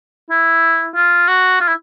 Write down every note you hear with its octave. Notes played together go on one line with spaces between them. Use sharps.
E4
F4
F#4
F4
E4